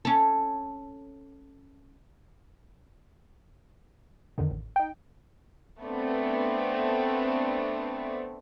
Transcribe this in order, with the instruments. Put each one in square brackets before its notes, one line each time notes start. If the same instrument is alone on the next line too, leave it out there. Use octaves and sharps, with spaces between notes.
[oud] C#4 A4
[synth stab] F2 D3 D#3
A1
D#4 G5
[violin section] A3 B3 C4 D4